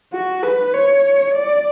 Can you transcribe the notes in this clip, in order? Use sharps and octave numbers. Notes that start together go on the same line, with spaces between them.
F#4
B4
C#5
D5